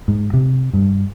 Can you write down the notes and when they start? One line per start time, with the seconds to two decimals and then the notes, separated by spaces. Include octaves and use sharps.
0.08 G#2
0.33 C3
0.73 G2